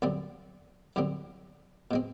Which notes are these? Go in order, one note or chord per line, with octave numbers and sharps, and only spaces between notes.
F#2 D3 G3 C4
F#2 D3 G3 C4
B2 G#3 C4